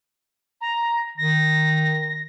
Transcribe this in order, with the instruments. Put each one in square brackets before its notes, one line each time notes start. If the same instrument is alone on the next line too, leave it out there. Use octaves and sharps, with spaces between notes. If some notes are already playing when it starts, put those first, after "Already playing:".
[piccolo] A#5
[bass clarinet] D#3 [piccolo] A#6